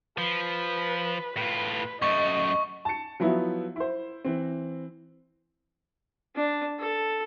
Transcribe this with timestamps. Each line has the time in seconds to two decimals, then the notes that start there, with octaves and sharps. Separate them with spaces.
0.18 F3 B4
1.37 A2 F4 B4
2.02 F#2 A3 D#5 C#6
2.85 A5 C#7
3.20 F3 F#3 B3 E4
3.76 E4 C5
4.25 E3 C4
6.35 D4
6.79 A4